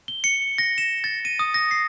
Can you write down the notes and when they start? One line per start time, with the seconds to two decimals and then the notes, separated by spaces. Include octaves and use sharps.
0.08 G7
0.24 C#7
0.58 A#6
0.78 E7
1.04 A6
1.25 D#7
1.39 D#6
1.54 A#6
1.71 C7